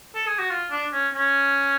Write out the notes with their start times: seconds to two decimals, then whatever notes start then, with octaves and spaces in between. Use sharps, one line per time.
0.15 A4
0.27 G#4
0.39 F#4
0.50 F4
0.71 D4
0.93 C#4
1.15 C#4